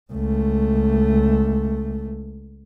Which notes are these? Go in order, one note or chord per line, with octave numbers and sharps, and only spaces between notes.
C#2 A3